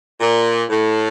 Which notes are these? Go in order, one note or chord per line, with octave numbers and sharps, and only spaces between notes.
A#2
A2